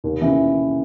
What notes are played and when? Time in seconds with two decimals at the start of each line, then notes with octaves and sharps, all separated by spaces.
0.04 D#2
0.22 C#3 E3